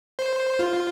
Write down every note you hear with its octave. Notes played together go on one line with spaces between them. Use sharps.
C5
F4